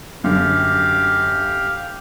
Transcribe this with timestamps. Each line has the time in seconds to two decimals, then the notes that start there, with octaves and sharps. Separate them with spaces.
0.24 F#2 D3 G4 F5